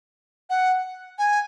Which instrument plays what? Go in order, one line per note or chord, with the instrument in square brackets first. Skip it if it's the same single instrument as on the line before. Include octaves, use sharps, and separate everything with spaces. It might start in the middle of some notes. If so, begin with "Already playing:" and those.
[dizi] F#5
G#5